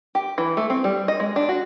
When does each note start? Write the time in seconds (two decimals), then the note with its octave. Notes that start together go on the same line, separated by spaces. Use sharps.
0.15 G4
0.38 E3
0.57 A3
0.70 C4
0.84 G3
1.08 D#5
1.20 G#3
1.36 D4
1.49 F#4